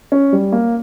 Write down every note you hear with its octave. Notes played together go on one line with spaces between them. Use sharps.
C#4
G3
A#3